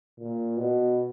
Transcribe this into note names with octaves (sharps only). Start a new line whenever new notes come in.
A#2
B2